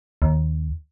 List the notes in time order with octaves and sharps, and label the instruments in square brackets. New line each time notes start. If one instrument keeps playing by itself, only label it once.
[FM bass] D#2